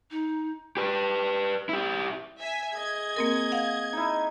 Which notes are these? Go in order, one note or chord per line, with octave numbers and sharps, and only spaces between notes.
D#4
G4 B4
E4 G4
E5 G#5
G#4 D#5 G#6
A#3 C4 A#4
F5 F#5
D#4 E4